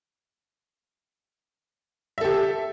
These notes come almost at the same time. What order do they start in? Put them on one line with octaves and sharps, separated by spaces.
E5 A4 G4